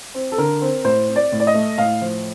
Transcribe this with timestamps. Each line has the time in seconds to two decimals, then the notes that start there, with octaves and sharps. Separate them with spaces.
0.14 C4
0.32 A4
0.38 D3 A#4
0.61 C4
0.84 A2 C5
1.08 C4
1.16 D5
1.32 A2
1.40 D5
1.47 D#5
1.54 A3
1.78 A2 F5
2.01 F3